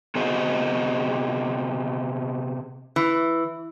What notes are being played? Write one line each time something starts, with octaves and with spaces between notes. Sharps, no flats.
C3 B3 F#4 G#4 C5 D#5
E3